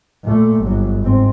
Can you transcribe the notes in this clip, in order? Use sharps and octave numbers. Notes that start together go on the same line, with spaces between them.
A#2 A3
G1 F#3
G#2 C4